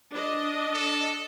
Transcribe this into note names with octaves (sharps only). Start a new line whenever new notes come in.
D4 D#5
A4